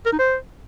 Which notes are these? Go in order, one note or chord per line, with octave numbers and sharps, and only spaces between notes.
A#4
D#4
C5